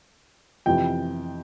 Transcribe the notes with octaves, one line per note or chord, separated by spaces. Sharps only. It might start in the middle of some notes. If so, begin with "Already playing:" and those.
F2 C3 E3 G5